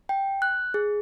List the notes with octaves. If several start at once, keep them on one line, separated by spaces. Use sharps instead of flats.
G5
F#6
G#4